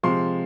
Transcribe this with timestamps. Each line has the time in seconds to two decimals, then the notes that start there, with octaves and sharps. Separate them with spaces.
0.03 C3 F3 G#3 C6